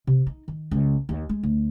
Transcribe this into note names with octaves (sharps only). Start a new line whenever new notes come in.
C3
D#4
D#3
C#2
D#2
G#3
D2